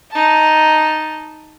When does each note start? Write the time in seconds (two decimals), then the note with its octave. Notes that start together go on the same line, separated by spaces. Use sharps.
0.11 D#4 A5